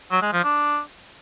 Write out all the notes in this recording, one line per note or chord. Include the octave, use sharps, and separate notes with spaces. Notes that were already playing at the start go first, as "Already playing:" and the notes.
F#3
G#3
F3
D4